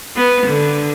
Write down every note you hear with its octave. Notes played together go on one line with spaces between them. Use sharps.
B3
D3